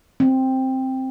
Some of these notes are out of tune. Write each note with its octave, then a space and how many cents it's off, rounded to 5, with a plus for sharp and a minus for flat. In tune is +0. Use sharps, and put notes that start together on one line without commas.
C4 +5